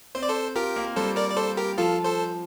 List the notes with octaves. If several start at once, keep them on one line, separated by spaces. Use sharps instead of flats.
C4 C5
D5
A4 C5
F4 G4 A#4
A#3
G3 A4 C5
A#4 D5
D5
A4 C5
G4 A#4
F3 F4 A4
A4 C5